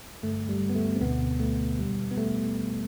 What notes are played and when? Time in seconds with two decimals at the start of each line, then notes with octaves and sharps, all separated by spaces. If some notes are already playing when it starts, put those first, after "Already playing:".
0.23 G2 D3 A3
0.49 G3
0.70 B3
0.75 A3
0.96 C4
1.00 D2 B2 D3 B3
1.40 A3
1.79 E2 B2 G3
2.11 B3
2.18 A3